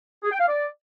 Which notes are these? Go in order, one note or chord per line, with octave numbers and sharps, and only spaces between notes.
G#4
G5
F5
D5